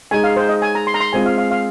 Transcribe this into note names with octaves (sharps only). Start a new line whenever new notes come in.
G#3 D#4 G#4 G#5
F5
C5
D#5
G#5
A#5
C6
A#5
C6
G#3 C4 F4 G#4 G#5
F5
F5
F5